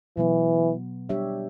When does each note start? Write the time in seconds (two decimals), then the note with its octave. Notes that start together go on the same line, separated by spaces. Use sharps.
0.17 B2 E3 F#3 B3
1.09 G3 D4 G4 C#5 E5